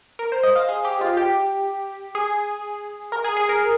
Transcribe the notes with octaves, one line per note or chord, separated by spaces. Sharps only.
A#4
C5
D#5
F5
G#4
G4
F4
G4
G#4
A#4
G#4
G#4
A#4